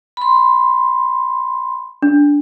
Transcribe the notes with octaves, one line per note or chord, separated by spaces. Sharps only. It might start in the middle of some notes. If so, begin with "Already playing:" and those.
B5 C6
D4